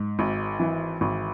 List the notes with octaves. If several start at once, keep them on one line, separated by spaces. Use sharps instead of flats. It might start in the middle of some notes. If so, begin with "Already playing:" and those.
Already playing: G#2
G#1
E3
G#1